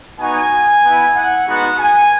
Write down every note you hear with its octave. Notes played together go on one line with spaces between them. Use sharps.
B3 D#4 F#4 G#5
B3 E4
F#5
G#3 B3 D#4 F#4 F#5
G#5